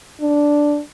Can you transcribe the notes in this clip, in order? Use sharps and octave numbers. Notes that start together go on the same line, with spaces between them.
D4